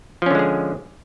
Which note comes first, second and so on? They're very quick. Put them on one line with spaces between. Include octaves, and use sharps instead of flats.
F3 C#4 D3 G#3 G#4